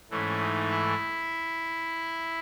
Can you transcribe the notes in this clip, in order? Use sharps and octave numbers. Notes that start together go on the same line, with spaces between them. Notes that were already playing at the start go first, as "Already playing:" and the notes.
G#2 E3 A3 C#4
D#4
E4